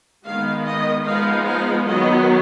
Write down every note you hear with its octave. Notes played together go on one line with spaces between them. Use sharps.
D#3 G#3 B3 F5
D#5
F3 G#3 B3 D#4 F5
F5
D#3 F#3 B3 D#5